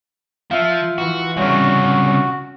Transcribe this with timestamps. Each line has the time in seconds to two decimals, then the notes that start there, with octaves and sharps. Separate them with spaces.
0.51 F3 F4 E5
0.98 E3 F#4
1.36 C2 C#3 C#4 F#4